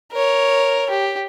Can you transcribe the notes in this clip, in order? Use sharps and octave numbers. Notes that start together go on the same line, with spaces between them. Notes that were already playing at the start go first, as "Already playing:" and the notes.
A#4 C#5
G4